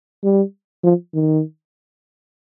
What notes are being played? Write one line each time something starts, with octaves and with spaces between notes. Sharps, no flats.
G3
F3
D#3